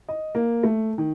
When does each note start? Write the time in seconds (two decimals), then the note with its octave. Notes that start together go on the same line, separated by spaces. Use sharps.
0.08 D#5
0.35 A#3
0.63 A3
0.98 D#3